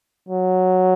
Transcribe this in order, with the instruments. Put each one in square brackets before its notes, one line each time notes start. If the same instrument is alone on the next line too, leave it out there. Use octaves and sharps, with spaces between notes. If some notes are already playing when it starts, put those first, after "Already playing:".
[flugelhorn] F#3